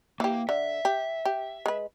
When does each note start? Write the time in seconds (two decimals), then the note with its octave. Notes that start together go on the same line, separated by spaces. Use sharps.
0.20 E3 A#3 G4
0.49 D3 E5
0.85 G4
1.25 G4
1.66 G#3 B4